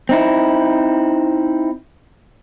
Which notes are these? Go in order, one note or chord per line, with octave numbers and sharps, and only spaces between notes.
C4 D#4 E4